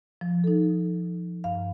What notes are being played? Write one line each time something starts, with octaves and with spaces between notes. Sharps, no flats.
F3
D#4 A4
G2 F5